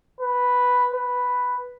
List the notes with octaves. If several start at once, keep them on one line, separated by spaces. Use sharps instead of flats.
B4
B4